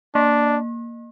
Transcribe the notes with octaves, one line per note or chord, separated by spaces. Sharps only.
A#3 D4